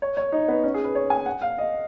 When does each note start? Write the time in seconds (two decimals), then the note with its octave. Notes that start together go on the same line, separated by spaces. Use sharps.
0.02 C#5
0.17 C#5
0.32 D#4
0.48 B3
0.63 C#4
0.74 G#4
0.85 B4
0.95 C#5
1.10 G#5
1.26 F#5
1.42 F5
1.58 D#5